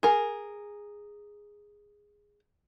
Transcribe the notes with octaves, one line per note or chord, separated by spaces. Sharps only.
G#4 A#4